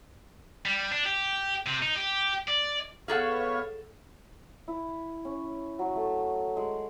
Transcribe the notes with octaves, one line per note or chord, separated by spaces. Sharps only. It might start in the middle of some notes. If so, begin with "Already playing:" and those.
G3
D4
G4
C3
D#4
G4
D5
B3 G#4 A4 C#5 F5 F#5
E4
C#4
F#3
A3
G#3